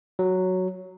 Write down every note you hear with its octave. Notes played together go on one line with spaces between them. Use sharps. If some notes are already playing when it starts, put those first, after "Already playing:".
F#3